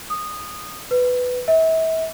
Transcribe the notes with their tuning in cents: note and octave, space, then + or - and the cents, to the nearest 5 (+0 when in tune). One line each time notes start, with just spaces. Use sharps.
D#6 -15
B4 +10
E5 -35